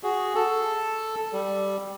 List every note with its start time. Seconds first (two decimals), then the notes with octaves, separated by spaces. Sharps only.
0.03 F#4 G#4
0.35 A4
1.33 G3